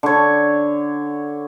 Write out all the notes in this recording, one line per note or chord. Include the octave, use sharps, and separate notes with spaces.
D3 C#5